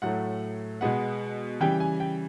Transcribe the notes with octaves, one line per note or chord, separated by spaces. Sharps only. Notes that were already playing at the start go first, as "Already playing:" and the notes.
A2 F#3 A3 F#5
B2 G#3 B3 F#5
C#3 E3 G3 G5
G#5
G5